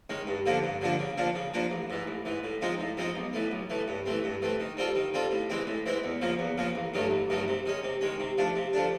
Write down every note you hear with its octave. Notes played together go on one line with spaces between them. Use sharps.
D#3 G#3 C#4
G2
D3 F3 A#3 D4
G2
D3 F3 A#3 D4
C#3
F3 A#3 D4
C#3
F3 A#3 D4
A1
G#2 E3
A1
G#2 E3
A2
F3 G#3 C4 D#4
A2
F3 G#3 C4 D#4
B1
A2 E3 A3
B1
A2 E3 A3
G2
E3 A3 C4
G2
E3 A3 C4
D#3
G3 C4 F4 A4
D#3
G3 C4 F4 A4
A2
E3 G#3 C4 E4
A2
E3 G#3 C4 E4
E2
C#3 F3 A#3
E2
C#3 F3 A#3
A1
G2 D#3 F#3 A3
A1
G2 D#3 F#3 A3
C3
D#3 G#3 C#4
C3
D#3 G#3 C#4
C3
F3 A3 D4
C3
F3 A3 D4